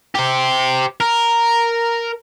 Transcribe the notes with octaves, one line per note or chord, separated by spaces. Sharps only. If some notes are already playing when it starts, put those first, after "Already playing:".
G4 C5
A#4